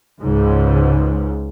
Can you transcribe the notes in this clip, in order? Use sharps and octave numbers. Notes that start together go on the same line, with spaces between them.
C#2 G#2